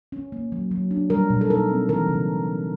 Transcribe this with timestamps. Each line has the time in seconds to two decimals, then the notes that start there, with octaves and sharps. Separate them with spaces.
0.12 C#4
0.32 A#3
0.52 F#3
0.71 F#3
0.91 D4
1.10 G3 A#4
1.30 B2
1.41 A4
1.50 D#4 A#4
1.69 C4
1.89 E3 A#4
2.09 C#3